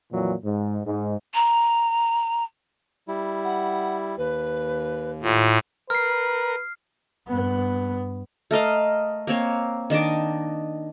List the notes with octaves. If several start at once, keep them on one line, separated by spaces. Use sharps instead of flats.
F2 A#2 E3 F#3
G#2
G#2
A#5
G3 E4
F#5
D#2 B4
A2 F4
A#4 B4 F6 C7
G2 B3
A3 A#4 D#5 F5
A#3 C4 C#5
D#3 D4 D#5 D6